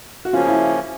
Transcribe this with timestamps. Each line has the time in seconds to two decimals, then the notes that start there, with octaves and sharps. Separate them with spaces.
0.25 F#4
0.33 C#3 F3 A#3 C#4 F4
0.47 E4